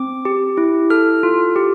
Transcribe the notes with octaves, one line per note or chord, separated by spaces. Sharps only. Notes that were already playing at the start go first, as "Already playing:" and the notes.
Already playing: C4 D6
G4
E4
A4 F6
F4
G4